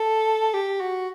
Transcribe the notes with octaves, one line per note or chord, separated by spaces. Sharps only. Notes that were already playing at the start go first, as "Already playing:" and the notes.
Already playing: A4
G4
F#4